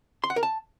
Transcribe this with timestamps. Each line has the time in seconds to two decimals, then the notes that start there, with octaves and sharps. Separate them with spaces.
0.24 C6
0.30 F#5
0.36 A#4
0.43 A5